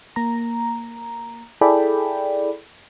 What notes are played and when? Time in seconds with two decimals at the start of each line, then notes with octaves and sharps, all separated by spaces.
0.16 A#3 A#5
1.61 E4 G#4 A4 D5 G5 B5